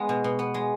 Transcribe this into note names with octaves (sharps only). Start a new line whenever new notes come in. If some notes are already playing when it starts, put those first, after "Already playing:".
Already playing: G#3 B3
B2
B2
B3
G#3